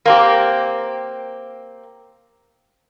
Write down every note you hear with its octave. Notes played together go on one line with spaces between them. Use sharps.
A#3 C4 G4